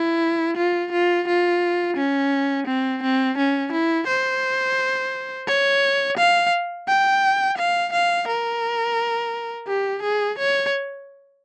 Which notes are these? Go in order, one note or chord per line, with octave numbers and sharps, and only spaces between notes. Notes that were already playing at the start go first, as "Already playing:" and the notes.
Already playing: E4
F4
F4
F4
C#4
C4
C4
C#4
E4
C5
C#5
F5
G5
F5
F5
A#4
G4
G#4
C#5